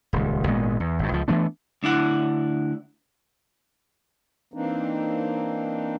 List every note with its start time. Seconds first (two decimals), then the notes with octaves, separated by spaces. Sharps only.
0.13 D#1 C#2
0.47 G#1 A#2 G#3 B3
0.80 E2
0.99 G#1 G2
1.12 C#2 F3
1.28 E3 A3 B3 D4
1.83 D2 D4 E4 F#5
4.54 E3 A#3 C4 D4 D#4